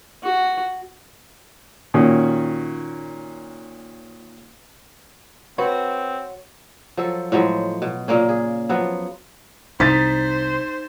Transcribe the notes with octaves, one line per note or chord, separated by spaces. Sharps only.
F#4
A#2 D#3 C#4 F#4
C4 F#4 B4 C#5
F3 F#3 A4
A2 F3 F#3 G#3
B2
A#2 C#3 A#3 C#4
G#4
F3 F#3 B3
C2 D#4 C5 A6 B6